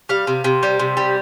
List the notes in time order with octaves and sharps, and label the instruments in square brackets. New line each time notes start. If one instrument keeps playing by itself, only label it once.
[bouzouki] G3 F5
C3
C3
G3
C3
G3